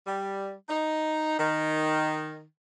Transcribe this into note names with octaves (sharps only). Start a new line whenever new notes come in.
G3
D#4
D#3